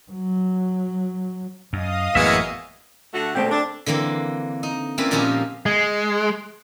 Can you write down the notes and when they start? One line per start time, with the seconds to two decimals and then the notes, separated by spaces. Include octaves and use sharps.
0.11 F#3
1.73 F#2 D#5 F5 D#6
2.15 A1 F#2 G#3 A#3 B3 E4 F#4 E5
3.13 D3 A3 F#4
3.35 B2 D3 G#3 A3 C4 G5
3.50 D4 A4
3.86 D3 E3 A#3 C4
4.63 D#4
4.98 A#3 C4 C#4 E4 B4 D5
5.11 A#2 F3 C4 C#4 D#4 G4
5.66 G#3